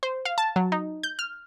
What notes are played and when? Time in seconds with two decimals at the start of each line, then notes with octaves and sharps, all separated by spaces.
0.03 C5
0.25 F5
0.38 A5
0.56 F#3
0.72 D#4
1.03 G6
1.19 F6